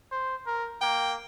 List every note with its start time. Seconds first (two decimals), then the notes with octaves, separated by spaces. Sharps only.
0.12 C5
0.46 A#4
0.81 A#3 G5